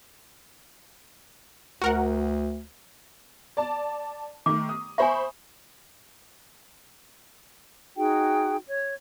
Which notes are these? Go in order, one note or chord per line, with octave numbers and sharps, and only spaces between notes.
D2 F#4 A#4 F#5
D5 A5
D#3 A3 D6
D#6
C5 E5 G#5 B5 C#6
D#4 F#4 G#4 G5
C#5